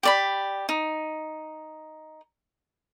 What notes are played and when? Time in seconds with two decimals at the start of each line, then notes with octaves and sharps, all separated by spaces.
0.03 G4 D5 B5
0.69 D#4